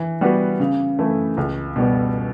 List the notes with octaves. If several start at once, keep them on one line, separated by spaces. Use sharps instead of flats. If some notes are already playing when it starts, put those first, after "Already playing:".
Already playing: E3
G3 B3 F#4 B4
C#3
E3 A3 E4
C#2
B2 G3 B3